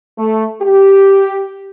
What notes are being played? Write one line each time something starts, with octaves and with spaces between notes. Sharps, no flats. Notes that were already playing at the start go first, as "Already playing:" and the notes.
A3
G4